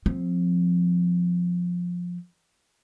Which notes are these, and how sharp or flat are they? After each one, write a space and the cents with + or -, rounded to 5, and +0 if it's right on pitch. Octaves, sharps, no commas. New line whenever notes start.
F3 +15 C4 +0